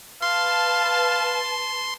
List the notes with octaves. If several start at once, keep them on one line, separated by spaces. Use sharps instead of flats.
B4 F5 A5 C6